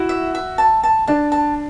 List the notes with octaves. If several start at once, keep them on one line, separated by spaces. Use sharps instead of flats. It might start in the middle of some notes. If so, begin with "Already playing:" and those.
Already playing: E4 F#4
E5
E5
A5
A5
D4 A5
A5